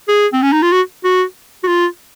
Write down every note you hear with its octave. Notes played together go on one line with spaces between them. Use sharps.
G#4
C4
C#4
D#4
F4
F#4
F#4
F#4
F4